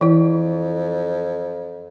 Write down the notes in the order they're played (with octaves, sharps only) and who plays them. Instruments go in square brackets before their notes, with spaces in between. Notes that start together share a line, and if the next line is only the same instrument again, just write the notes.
[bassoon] F2 [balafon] E3 E4